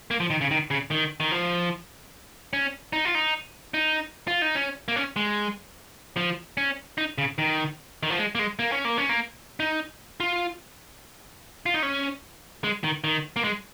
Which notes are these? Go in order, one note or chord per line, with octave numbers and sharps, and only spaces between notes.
A#3
F3
D#3
C#3
D#3
C#3
D#3
D#3
F3
C#4
D#4
F4
D#4
D#4
F4
D#4
C#4
A#3
C#4
G#3
F3
C#4
D#4
C#3
D#3
D#3
F3
G#3
A#3
G#3
A#3
C#4
A#3
C#4
A#3
D#4
F4
F4
D#4
C#4
G#3
D#3
D#3
A#3
G#3